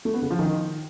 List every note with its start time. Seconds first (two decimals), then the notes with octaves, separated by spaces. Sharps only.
0.05 A3
0.14 B3
0.22 C#3
0.30 F3
0.39 D#3